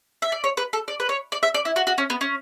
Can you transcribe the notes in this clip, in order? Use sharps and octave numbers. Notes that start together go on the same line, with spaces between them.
E5
D5
C#5
B4
A4
D5
B4
C#5
D5
E5
D5
E4
F#4
F#4
C#4
B3
C#4